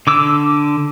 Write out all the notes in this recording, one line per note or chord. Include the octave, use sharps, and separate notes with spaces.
D3 D6 E6